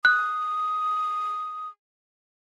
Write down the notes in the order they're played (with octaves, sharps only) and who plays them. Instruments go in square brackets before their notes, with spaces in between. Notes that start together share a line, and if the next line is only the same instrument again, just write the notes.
[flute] D#6 [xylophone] F#6